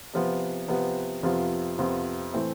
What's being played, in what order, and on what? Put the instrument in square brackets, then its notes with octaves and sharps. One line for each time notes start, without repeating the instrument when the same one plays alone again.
[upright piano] C3 F3 B3
C3 F3 B3
F2 C3 F3 B3 F4
F2 C3 F3 B3 F4
A2 E3 A3 C4